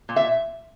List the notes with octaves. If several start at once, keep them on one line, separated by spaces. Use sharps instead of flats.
A#2
E5